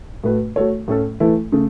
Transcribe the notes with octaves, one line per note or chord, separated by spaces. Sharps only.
A2 A3 F#4 B4
A3 F#4 A4 C#5
A2 A3 C#4 A4
E3 A3 E4 A4
C#3 A3